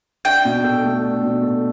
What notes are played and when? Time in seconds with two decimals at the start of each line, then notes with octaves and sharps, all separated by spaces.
0.25 D4 G5
0.45 B2
0.64 A4
0.84 A3
1.03 D4
1.23 B2
1.43 A4